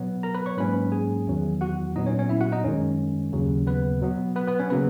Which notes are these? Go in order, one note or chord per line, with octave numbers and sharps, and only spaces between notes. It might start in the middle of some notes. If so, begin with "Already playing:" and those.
Already playing: B2 F#3 B3
A#4 A#5
B4 B5
C#5 C#6
G#2 F#3 A#3 C#4 B4 B5
G#4 G#5
E2 D#3 F#3
F#4 F#5
A#2 F#3 B3 D#4 D#5
C#4 C#5
C#4 C#5
E4 E5
F#4 F#5
D#4 D#5
F#2 D#3 G#3 C#4 C#5
D#2 C#3 F#3
B3 B4
B2 F#3 B3
B3 B4
B3 B4
C#4 C#5
C#3 F#3 A#3 B3 B4